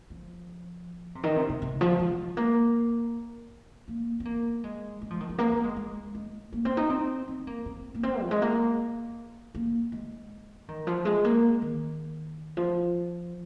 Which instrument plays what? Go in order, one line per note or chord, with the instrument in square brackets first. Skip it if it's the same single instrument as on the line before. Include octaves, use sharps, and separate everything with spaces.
[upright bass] F3
C3
D#3
C3
C3
C3
F3
G#3
A#3
A#3
C4
A#3
G#3
G#3
F3
D#3
F3
A#3
C4
G#3
G#3
G#3
A#3
C4
D#4
C4
C4
A#3
C4
A#3
C4
F3
G#3
A#3
A#3
G#3
D#3
F3
G#3
A#3
D#3
F3